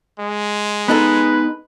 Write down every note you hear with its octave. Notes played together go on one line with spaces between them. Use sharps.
G#3
B3 D#4 A4 B4